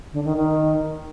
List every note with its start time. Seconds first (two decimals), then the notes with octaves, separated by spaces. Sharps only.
0.13 D3
0.25 D#3
0.37 D#3